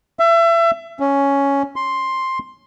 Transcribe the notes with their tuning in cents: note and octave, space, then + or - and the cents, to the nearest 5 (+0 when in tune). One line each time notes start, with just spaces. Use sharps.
E5 +30
C#4 +5
C6 +5